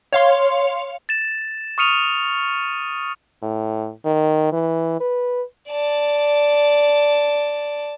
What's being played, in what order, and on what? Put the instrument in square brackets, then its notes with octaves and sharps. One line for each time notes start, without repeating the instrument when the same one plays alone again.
[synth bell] C#5 F5 C6
[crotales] A6 E7
C#6 D#6 F6 C#7 D#7 F7
[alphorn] A2
D#3
E3
B4
[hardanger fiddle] D5 A5